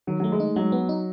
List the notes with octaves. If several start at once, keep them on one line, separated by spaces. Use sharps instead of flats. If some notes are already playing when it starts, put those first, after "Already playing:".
D#3 F#3
F#3 A3
G#3
D#4
F#3 G#3
B3
D#4